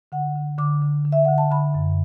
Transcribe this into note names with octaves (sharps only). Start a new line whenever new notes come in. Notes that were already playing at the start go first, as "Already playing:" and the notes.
D3 F#5
D3
D3 D6
D3
D3
E5
D3 F#5
A5
D3 B5
F#2